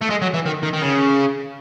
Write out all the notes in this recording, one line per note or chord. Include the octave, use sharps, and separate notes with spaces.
A3
G#3
F#3
E3
D#3
D#3
D#3
C#3